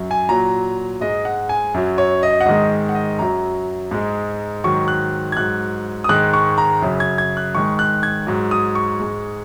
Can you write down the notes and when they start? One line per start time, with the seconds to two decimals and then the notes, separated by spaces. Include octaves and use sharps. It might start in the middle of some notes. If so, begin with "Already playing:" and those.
Already playing: F#2 F#3
0.11 G#5
0.29 A#2 F#3 A#5
1.01 G#2 G#3 D#5
1.25 F#5
1.49 G#5
1.74 F#2 F#3
1.98 C#5
2.23 D#5
2.41 F#5
2.46 G#2 D#3 G#3 D#5
2.89 F#5
2.95 D#5
3.19 F#2 F#3 A#5
3.91 G#2 G#3
4.64 G#2 D#3 F#3 C#6
4.88 F#6
5.32 G#6
5.37 G#2 F#3 F#6
6.04 D#6
6.09 G#2 D#3 G#3 F#6
6.33 C#6
6.58 A#5
6.82 F#2 C#3 F#3
7.00 G#6
7.18 G#6
7.37 F#6
7.55 G#2 D#3 G#3 C#6
7.79 F#6
8.03 G#6
8.27 G#2 F#3
8.51 D#6
8.75 C#6
9.00 G#2 G#3